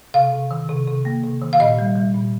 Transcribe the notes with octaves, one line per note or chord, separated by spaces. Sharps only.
C3 F5
C3
D#3
C3
C3
A#3
C3
D#3
F5
A#2 D#5
G3
G3
A#2